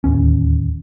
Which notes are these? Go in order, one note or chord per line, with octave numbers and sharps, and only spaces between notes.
D1 D#2 C#4